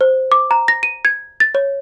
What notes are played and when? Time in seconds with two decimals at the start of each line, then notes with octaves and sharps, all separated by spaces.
0.01 C5
0.32 D6
0.51 A#5
0.68 A#6
0.83 D#7
1.05 G#6
1.40 A6
1.55 C#5